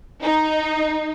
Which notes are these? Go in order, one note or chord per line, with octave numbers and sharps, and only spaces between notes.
D#4